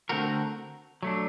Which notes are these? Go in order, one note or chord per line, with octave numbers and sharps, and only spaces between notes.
D3 A3 C4 F#4 A#4
F#3 A3 D4